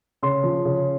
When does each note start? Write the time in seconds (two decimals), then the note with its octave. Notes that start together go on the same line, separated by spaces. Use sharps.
0.23 C#3 C6
0.44 F3
0.65 C#3